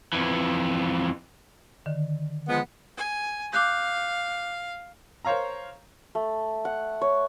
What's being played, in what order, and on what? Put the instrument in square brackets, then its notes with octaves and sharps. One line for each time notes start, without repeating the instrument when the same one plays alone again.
[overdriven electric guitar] F2 E3
[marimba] D3 D#3
[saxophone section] F3 G#3 B3
[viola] G#5
[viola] F5 [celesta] D6 F#6 G6
[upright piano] A#4 C5 C#5 F5 A#5
[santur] A3
F#5
C#5